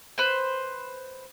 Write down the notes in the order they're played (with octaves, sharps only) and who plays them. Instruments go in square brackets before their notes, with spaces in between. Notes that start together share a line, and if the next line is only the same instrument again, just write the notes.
[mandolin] B4 C5